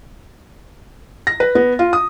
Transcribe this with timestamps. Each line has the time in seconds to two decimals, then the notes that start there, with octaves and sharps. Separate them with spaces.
1.27 A#6
1.40 B4
1.55 B3
1.79 F4
1.93 D#6